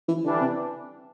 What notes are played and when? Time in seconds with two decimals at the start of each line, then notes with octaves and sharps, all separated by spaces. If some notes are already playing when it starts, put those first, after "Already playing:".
0.08 E3
0.24 D3 E3 G3 D4
0.40 C3